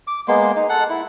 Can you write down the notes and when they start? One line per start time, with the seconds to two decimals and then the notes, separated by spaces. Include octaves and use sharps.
0.07 D6
0.28 G#3 A#3 B3 C6
0.56 D#4
0.69 A4 F#5
0.90 E4